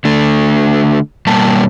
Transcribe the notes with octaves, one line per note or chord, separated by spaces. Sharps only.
D3 A3
B2 G3 A#3 A5